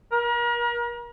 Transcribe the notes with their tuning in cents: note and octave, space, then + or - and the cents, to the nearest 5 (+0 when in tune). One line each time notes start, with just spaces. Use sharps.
A#4 +40